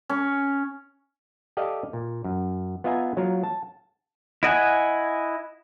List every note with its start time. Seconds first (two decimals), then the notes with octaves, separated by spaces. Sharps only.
0.09 C#4
1.57 G4 A4 D5 D#5 F5
1.93 A#2
2.24 F#2
2.84 B3 F4 D#5 E5 G#5 A#5
3.17 F#3 A#3 F4 A#4
3.43 A5
4.43 E4 D#5 F#5 G#5